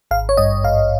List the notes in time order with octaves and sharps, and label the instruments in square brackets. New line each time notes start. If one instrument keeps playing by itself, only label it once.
[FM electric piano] G#1 F5
C#5
G2 D#5
G#1 F5